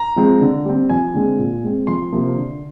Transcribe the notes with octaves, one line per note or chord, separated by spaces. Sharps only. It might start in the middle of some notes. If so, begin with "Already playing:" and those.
Already playing: A#5
F3 G#3 C4
D3
G3 C4
F2 G#5
D3 G#3 C4
A#2
G#3 C4
F2 C6
C3 F3 A#3
D3